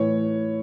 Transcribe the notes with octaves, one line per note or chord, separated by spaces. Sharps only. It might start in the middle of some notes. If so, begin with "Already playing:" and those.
Already playing: A2 E3 C#5